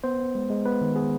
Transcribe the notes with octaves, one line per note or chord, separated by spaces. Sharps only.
B3 C5
B3
G#3
G#3
B3 B4
D#3
B3 G#4